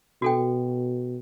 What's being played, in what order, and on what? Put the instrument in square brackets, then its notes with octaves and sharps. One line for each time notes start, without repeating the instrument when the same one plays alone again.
[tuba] B2 [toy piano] F#4 A4 G5